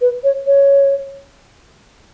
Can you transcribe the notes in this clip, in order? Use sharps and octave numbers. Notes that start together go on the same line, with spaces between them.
B4
C#5
C#5